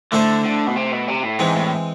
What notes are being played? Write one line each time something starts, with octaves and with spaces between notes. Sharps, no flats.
D3 A3 E4 A4 C5
D3
B2
C3
B2
C3
A2
G#2 E3 G#3 C4
A2